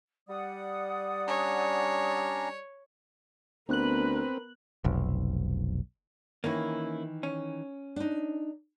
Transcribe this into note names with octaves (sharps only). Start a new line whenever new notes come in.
G3 D5 F#5 D#6
C#4 D4 C#5 A#5
D2 B3 C4 A#4 B4 F#6 F#7
F1 B1
D#3 E3 A#3 C#4 E4
C#4
D4 D#4